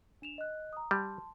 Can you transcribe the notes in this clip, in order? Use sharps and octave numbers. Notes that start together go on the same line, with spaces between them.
D4 E7 F7
D#5 F#6
A#5 D#6
G3 A5 C6